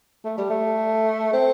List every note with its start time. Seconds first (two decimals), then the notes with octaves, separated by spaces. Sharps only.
0.25 A3
0.38 G3
0.50 A3
1.33 C4